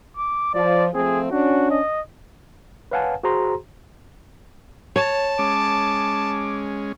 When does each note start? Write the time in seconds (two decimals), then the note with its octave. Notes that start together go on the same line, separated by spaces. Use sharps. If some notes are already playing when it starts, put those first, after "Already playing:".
0.17 D6
0.54 F3 D5
0.94 F3 A3 C4 G#4
1.31 C#4 D4 F#4
1.70 D#5
2.91 B4 C#5 F5 F#5 G#5 A5
3.24 F#4 G#4 C5 A#5 C6
4.96 C#5 A5
5.39 G#3 C#4 D6